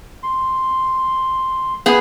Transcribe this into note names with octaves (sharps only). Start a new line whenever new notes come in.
C6
B3 G#4